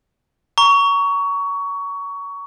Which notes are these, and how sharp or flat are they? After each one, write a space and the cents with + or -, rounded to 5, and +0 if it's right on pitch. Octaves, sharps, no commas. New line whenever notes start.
A#5 +0 C#6 +20